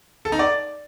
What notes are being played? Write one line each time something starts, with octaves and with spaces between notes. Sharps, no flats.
A4
D#4
D5